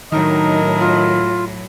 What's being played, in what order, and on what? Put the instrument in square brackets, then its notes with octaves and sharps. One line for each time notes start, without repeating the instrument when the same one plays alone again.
[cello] A2 F#3 [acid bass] D#3 [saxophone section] D4 A#4 D#5 [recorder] D#4
[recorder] F4